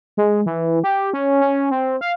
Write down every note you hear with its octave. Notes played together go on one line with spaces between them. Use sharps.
G#3
E3
G4
C#4
C#4
C4
F5